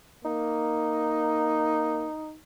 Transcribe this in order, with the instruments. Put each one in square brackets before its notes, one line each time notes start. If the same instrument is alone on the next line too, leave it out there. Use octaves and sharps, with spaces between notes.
[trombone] A#3 [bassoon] D#4